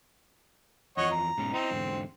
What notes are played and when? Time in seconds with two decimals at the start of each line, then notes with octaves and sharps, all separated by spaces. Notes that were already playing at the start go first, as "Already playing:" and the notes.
0.97 E2 F3 C#5 D#5 F#5
1.11 A#5
1.38 G#2 B2 C#4
1.53 C4 E4 D#5 A#5
1.71 E2 G#2 D3